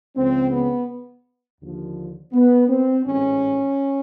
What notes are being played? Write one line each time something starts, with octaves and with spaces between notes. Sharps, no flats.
C#2 C#3 F3 C4
B3
D#2 D3 F3
B3
C4
A1 G#2 E3 C#4